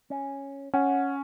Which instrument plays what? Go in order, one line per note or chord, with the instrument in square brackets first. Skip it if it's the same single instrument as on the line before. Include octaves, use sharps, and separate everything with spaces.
[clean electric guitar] C#4
[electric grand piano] C#4 [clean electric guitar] F#5